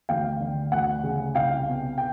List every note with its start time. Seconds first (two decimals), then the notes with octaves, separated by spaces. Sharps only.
0.09 D2 F5 G5
0.40 D3
0.72 D2 F#5
1.04 C#3
1.34 C2 F5 G5
1.67 B2
1.98 G5